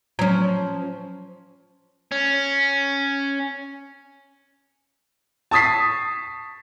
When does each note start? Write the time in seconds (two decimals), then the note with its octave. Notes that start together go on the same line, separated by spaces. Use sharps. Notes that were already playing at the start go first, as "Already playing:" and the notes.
0.19 F3 F#3 C#4
2.12 C#4
5.51 A5 C#6 D#6 A6 B6 C7